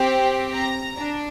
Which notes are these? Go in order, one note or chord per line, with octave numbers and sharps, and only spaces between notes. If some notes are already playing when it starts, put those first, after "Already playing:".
Already playing: C4 G4
A#5
D4